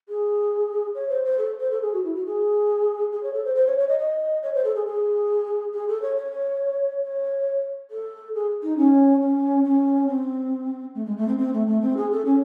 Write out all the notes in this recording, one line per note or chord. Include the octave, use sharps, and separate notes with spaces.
G#4
C#5
C5
C5
A4
C5
A4
G#4
F#4
E4
F#4
G#4
G#4
C#5
A4
C5
C5
C#5
C#5
D#5
D#5
C#5
C5
A4
G#4
G#4
G#4
A4
C#5
C#5
C#5
A4
G#4
D#4
C#4
C#4
C#4
C4
A3
G#3
A3
C4
C4
A3
A3
C4
G#4
A4
C#4